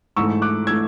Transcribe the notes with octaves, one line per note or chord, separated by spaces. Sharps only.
G#2 E3 A3 C#6 E6
D6 F#6
E3 A3 E6 G#6